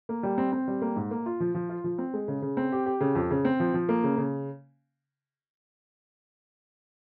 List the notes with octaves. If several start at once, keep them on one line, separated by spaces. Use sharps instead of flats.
A#3
G3
C4
C4
G3
A#3
G#2
A#3
F4
F3
F3
F4
F3
C4
G#3
C#3
C#3
C4
G4
G4
C#3
F2
C#3
C4
F3
F3
A#3
C#3
C#3